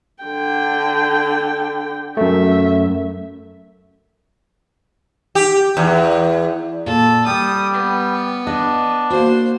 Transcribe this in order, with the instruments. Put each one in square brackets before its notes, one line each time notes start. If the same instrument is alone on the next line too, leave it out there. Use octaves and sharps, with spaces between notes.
[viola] D3 G5
[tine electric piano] F#2 A3 [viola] E5
[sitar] G4
E2
[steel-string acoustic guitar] A#2 [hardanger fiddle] A4
[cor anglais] G3 [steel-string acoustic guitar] G5 [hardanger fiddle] D#6
[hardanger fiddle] B3
[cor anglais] D4 [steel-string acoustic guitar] D#5
[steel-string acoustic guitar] A#3 F#4 [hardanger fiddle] C5